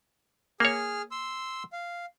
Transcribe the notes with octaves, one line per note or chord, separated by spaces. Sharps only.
A#3 G#4 C#5 F6
C6 E6
F5